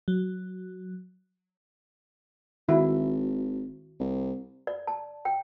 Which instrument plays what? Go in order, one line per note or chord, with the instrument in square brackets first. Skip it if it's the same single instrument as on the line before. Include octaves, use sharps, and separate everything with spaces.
[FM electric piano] F#3
[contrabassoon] G#1 [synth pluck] D#3 F#4 [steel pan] E4
[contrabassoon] C2
[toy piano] D5
A5
G5